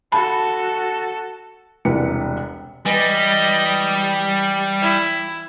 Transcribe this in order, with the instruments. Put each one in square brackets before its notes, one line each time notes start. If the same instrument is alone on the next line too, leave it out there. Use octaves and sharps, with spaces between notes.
[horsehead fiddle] F#4 A4 [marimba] A5 B5
[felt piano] E1 C2 C3 B4 C#7
[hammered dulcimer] E3 [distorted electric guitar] G3 [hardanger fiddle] D#5
[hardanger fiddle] E4